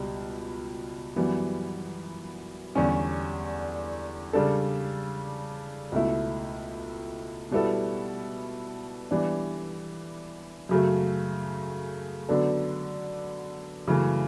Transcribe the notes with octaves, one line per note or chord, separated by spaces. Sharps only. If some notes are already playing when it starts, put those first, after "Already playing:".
Already playing: C#2 B2 G3
F#2 E3 G3 B3
E2 D3 G3 C#4 G4
C#3 G3 D4 A4
C#2 B2 A3 E4
B2 G3 B3 E4 A4
E3 G3 B3 D4
F#2 C#3 F#3 A3
D3 F#3 B3 D4 A4
F#2 C#3 E3 A3